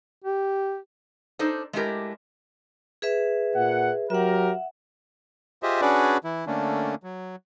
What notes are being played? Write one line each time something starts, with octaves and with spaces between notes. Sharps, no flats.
G4
D4 D#4 A4 C5
G#3 A3 D4 E4 G4 A#4
G#4 B4 E5
A#2 F#5
F#3 G4 A#4 E5 F#5
F4 G4 G#4 C5 D#5 E5
C#4 D4 F#4 G#4 B4 D5
E3 E4
D3 A3 A#3 C#4 D4
F#3